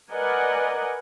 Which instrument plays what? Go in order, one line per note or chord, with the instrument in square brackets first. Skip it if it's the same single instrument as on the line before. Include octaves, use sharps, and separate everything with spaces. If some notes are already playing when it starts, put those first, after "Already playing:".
[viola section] A#4 B4 D5 D#5 F#5 G#5